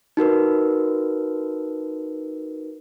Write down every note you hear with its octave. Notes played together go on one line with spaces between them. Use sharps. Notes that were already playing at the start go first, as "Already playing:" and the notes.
D#4 F#4 A#4 B4